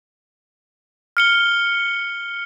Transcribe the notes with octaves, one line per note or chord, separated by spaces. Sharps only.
F6 C#7 G7